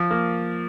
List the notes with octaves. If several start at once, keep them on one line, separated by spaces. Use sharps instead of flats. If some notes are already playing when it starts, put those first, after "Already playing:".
Already playing: F3
A#3